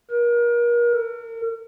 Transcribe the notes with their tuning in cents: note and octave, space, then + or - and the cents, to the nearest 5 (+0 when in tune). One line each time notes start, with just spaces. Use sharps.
A#4 +35
A#4 -40